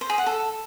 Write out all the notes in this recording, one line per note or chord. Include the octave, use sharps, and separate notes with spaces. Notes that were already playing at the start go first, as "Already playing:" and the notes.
C5
G#4
F#5
A4